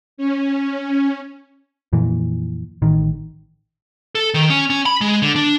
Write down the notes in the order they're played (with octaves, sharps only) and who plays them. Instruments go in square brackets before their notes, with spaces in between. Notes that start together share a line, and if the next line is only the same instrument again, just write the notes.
[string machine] C#4
[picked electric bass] F2 A#2 E3
A1 D#3
[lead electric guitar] A4
D#3
C#4
C#4
B5
G#3
D3
D4